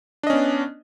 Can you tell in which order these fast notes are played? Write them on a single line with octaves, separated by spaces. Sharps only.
D4 D#5 C#4 B3